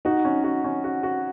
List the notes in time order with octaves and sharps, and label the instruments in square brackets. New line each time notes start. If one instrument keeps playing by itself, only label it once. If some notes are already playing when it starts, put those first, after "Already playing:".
[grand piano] D#4 [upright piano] F#4
[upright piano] C#4
F#4
C#4
F#4
F#4